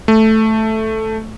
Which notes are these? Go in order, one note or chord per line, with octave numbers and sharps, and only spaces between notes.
A3